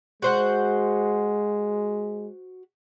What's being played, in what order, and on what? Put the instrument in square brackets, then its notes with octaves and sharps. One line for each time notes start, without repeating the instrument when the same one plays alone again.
[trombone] G#3 [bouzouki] F#4 C5 F#5